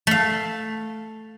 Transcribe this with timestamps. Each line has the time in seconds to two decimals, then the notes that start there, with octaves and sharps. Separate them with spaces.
0.07 A3 F5